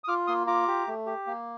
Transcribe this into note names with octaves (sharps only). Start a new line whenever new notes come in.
D#6
F4 D6 F6
A#3 C6 D#6
F4 A#5 D6
G4
A3
G4
A#3